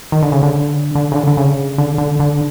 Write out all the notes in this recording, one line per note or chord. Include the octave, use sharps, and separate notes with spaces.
D#3
D3
C#3
D3
D3
C#3
D3
D3
C#3
D3
D3
D3